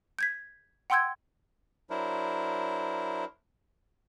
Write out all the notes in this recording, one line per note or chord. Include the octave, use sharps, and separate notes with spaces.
G6 G#6 B6
F#5 G5 C6 E6 G6 G#6
F#3 D4 E4 A#4 C5